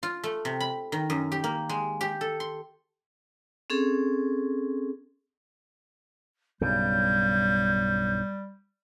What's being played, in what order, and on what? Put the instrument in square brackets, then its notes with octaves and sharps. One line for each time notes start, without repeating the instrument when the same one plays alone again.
[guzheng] F4
A3
C3
B5
D#3
F#2
G4
A#3
G#3
G4
A4
C6
[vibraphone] C4 C#4 G#4 A4
[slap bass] B1 G2 C#3 [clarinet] G3 [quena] G6